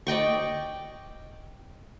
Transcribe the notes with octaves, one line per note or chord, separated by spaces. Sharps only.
D5 D#5 G5 C#6